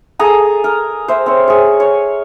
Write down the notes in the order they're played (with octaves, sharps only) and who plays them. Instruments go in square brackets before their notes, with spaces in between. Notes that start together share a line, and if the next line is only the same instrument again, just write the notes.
[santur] G#4 A4 A#5 D#6
A#4
C5 E5
C4 C#5
G#4 C#5
C#5